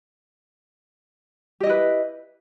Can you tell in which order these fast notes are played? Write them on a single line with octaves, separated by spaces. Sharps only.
G4 D#5 E4 B4